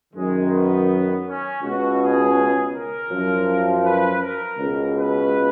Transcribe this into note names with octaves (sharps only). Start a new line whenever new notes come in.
F#2 D#3 G#3
B3
C#4
C#2 B2 F#4
G#4
A#4
F#2 F3
B4
A#4
C#2 B2
B4